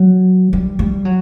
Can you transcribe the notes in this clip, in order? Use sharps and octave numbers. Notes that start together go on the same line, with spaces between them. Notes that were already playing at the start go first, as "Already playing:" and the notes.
Already playing: F#3
G3
G3
F#3